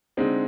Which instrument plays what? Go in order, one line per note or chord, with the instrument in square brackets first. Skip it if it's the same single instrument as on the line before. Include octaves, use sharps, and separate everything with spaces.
[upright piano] D3 G#3 D#4 [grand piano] C4